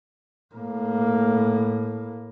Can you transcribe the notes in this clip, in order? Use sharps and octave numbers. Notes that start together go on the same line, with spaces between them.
A2 A#3